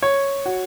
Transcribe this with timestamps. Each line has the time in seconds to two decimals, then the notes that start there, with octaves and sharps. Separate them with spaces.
0.02 C#5
0.46 F#4